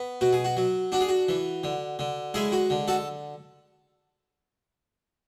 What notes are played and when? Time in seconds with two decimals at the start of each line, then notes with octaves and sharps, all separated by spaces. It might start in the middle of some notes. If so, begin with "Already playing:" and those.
Already playing: B3
0.21 B2 F#4
0.32 G#4
0.44 F#4
0.57 F#3
0.92 D4 F#4
1.00 G#4
1.09 F#4
1.29 E3
1.64 D3
1.99 D3
2.34 G#3 E4 G#4
2.52 F#4
2.70 D3
2.88 F#4 A4